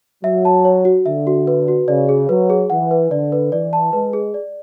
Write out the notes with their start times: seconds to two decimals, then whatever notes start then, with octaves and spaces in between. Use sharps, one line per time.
0.24 F#3 E5
0.45 A5
0.65 C#5
0.85 F#4
1.06 D3 E5
1.27 F#4
1.47 B4
1.68 F#4
1.88 C#3 D5
2.09 G#4
2.29 F#3 B4
2.50 G#4
2.70 E3 F#5
2.91 B4
3.11 D3 D5
3.32 B4
3.52 E3 D5
3.73 A5
3.93 G#3 B4
4.13 G#4
4.34 D5